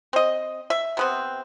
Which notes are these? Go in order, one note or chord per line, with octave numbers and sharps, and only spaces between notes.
C4 D#5
E5
C3 B3 C4